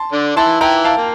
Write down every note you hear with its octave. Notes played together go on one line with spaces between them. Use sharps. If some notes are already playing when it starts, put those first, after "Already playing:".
Already playing: A5 C6
D3 D4
E3 E4 A5 C6
E3 E4 G5 A#5
F5 A5
A#3